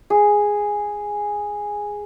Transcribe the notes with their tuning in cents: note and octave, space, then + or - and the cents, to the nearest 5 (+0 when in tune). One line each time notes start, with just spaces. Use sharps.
G#4 -5